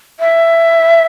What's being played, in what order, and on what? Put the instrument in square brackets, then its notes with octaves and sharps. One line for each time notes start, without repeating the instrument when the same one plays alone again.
[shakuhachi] E5